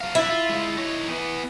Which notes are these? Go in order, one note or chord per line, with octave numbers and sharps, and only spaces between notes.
F#3 F5
F#3 D4 E4
F4
G#3 F4
D#4 C#5
E3 B3